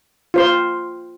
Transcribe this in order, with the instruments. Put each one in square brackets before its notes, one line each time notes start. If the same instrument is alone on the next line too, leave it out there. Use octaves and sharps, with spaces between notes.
[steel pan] F4 C5 C6